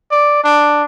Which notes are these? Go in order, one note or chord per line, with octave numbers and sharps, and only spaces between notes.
D5
D4